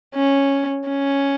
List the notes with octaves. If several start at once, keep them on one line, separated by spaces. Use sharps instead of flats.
C#4
C#4